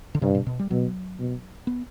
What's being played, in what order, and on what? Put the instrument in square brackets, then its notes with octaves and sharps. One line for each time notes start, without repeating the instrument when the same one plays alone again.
[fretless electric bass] D3
[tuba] G2 [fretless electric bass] C3
[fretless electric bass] B2
B2
G3
[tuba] B2 [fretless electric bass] F#3
[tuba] B2
[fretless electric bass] B3